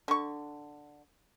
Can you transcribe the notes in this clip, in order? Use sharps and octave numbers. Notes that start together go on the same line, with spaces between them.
D3 C#6